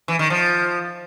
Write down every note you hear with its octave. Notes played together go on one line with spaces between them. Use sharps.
E3
D#3
F3